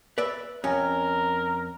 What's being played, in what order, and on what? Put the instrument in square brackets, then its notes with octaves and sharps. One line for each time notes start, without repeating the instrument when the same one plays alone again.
[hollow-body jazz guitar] B4 D5 E5
[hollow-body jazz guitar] F2 C#4 [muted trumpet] A#4